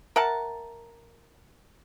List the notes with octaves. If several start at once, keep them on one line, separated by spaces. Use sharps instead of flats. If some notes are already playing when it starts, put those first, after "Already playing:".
A#4 E5 F#5 A5